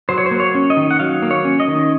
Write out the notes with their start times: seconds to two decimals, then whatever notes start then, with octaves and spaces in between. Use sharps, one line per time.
0.09 F#3 C5
0.18 C#5
0.26 C5
0.31 A#3
0.40 C#5
0.55 C#4
0.70 D#5
0.77 D#3
0.91 F#5
1.00 F#3 F5
1.22 A#3
1.31 C#5
1.45 C#4
1.60 D#5
1.68 D#3